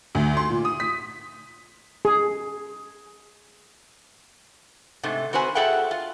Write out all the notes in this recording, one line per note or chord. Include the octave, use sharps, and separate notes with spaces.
D2
C6
A#2
D#6
B6
G#4
G#2 C3 A3
C4 F#4 B4 C5 G#5
F#4 G#4 A4 E5 F#5 G5
F4